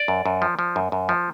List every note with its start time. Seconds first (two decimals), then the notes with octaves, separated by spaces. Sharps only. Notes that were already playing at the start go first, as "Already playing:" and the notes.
Already playing: D5
0.08 F#2
0.26 F#2
0.42 F3
0.59 F3
0.76 F#2
0.92 F#2
1.09 F3